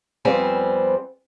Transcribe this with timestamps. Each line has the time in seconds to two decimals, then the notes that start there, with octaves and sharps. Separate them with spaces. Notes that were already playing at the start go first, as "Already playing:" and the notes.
0.25 F2 G3 B3 C4 C5 G#5